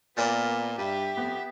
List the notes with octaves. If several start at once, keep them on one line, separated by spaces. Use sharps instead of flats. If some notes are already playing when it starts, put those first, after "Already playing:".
A#2 B3 A#4 D5 A6
G2 G4 E5
F2 B3